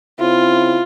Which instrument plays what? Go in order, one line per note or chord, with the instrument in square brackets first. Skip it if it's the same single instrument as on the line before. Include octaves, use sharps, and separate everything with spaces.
[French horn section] C#3 C4 E4 [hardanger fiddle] F4